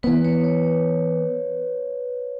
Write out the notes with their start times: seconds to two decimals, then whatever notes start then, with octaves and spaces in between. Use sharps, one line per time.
0.03 E3 B3 B4
0.25 C#5
0.44 C#5